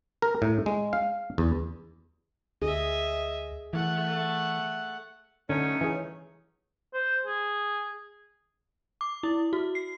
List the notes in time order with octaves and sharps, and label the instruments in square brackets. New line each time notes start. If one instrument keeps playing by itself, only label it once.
[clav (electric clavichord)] A#4
A2
G#3
F5
E2
[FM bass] D2 [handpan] G#4 [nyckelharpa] D#5 E5
[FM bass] E3 [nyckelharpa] A3 F#5
[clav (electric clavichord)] D3 [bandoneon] F#3 A3 D#4 [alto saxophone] C#4
[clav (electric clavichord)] E3 G#4
[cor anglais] C5
G#4
[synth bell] D6
E4
F#4
C7